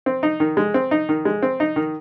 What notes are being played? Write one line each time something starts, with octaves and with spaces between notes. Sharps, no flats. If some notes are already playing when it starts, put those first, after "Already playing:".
C4
D#4
D#3
G#3
C4
D#4
D#3
G#3
C4
D#4
D#3